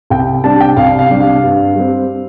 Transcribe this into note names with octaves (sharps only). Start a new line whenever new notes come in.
C2 G5
C3 G3 D4 A5
G5
C2 F5
F5
C3 G3 D4
F5
G2
G3 C4